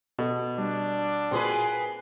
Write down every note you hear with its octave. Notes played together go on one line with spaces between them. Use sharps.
B2 A4
G3 D4
A#2 C4 F#4 G#4 B4 C6